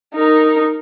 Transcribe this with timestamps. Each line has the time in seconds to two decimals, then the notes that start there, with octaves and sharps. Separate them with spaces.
0.14 D#4 A#4